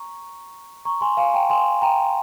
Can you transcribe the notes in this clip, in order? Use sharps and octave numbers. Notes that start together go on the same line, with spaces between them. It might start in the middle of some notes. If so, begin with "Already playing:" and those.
Already playing: A#5 C#6
A#5 C#6
G#5 C6
F5 G#5
G5 A#5
G#5 C6
G5 A#5